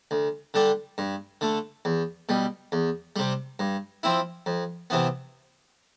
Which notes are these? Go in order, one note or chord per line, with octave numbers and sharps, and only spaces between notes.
D2
D3 G3 D4
G2
D3 A3
E2
B2 G3
E2
C3 G3
G2
F3 C4 E4
F2
C3 E3 B3